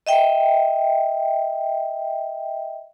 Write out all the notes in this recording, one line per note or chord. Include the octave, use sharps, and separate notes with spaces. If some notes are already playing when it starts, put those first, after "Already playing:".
D#5 E5 G5